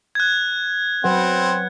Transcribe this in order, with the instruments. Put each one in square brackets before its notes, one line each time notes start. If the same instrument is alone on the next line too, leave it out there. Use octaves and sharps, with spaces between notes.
[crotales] F#6 G#6
[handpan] F#3 B4 F#5 [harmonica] C4